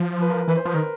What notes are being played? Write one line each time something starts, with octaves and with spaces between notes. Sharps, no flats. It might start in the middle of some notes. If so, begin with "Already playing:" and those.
Already playing: F3
B4
A#4
E3 B4
C5
F3 B4
D#3 A#4